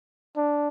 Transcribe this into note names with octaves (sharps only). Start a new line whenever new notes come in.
D4